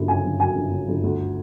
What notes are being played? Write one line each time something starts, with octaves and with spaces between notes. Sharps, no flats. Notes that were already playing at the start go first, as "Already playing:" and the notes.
Already playing: G1 F#2
C#3 G#5
G1
F#2 G#5
G1
C#3
G1
D2